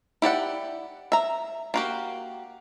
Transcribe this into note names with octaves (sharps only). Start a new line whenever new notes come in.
E4 G4 D5 F#5
E5 A#5
A#3 F#4 G4